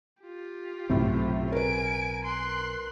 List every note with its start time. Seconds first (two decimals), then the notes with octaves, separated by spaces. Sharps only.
0.22 F4 G4
0.90 B1 F#2 A2 C3 C4
1.52 A#4 B4 G#5 D7
2.24 C6 F#6